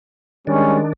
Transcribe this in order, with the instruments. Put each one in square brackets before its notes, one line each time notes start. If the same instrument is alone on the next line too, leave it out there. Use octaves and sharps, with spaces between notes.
[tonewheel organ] D#3 D4 [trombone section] G3 C#4 [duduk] G#3